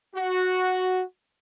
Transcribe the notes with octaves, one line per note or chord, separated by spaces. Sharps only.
F#4